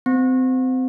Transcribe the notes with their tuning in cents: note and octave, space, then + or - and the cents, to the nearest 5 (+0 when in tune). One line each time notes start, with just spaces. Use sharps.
C4 -25